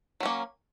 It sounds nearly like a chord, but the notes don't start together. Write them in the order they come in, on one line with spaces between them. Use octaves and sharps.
F#3 C#4 A#3